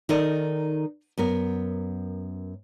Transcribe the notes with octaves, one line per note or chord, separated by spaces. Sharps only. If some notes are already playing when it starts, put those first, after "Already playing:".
D#3 D#4 A4 A#4 D5 D#5
F#2 B3 A#4